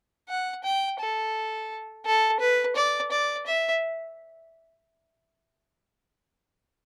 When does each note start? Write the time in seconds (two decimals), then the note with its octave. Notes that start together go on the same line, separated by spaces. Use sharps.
0.29 F#5
0.64 G5
0.99 A4
2.06 A4
2.40 B4
2.75 D5
3.11 D5
3.46 E5